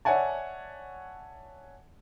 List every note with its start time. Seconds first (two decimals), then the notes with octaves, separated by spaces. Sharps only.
0.05 C#5 D5 E5 F#5 G#5 A5